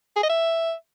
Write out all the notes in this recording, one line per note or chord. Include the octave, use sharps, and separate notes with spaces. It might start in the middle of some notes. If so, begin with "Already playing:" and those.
G#4
D#5
E5